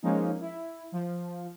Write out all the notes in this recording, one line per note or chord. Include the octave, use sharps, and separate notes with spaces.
F3 G#3 A#3 C#4 D#4
E4
F3